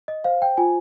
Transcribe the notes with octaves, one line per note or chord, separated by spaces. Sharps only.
D#5
C5 F5
G5
F4 G#5